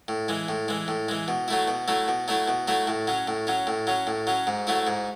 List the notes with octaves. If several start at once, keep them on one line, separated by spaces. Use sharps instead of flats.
A2
E3 G#3
A2
E3 G#3
A2
E3 G#3
B2
F#3 A3 E4
B2
F#3 A3 E4
B2
F#3 A3 E4
B2
F#3 A3 E4
A2
F#3 C#4
A2
F#3 C#4
A2
F#3 C#4
A2
F#3 C#4
G#2
F#3 A3 E4
G#2